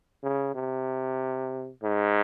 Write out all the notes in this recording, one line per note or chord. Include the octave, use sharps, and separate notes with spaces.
C#3
C3
G#2